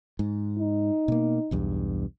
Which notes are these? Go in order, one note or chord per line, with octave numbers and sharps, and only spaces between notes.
G#2
D#4
B2 A#3
B1 E2 G2